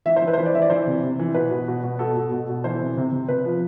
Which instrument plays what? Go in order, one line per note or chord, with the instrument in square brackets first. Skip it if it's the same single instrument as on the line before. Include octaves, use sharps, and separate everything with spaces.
[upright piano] E3 E5
C5
E3
B4
C5
E3 B4
D5
E3 E5
D5
E3 C5
C3
C3
E3
B2 B4
B2
B2
B2
B2 A4
B2
B2
B2
E3 C5
C3
C3
C3
C3 B4
F3